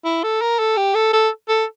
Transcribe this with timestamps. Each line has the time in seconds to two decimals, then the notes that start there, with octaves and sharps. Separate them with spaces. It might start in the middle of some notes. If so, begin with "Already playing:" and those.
0.05 E4
0.23 A4
0.41 A#4
0.59 A4
0.77 G4
0.95 A4
1.13 A4
1.49 A4